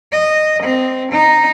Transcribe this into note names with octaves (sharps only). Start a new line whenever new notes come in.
D#5
C4
D#4